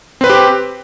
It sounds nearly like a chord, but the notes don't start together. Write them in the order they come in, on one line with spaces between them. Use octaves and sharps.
C4 B4 C5 G4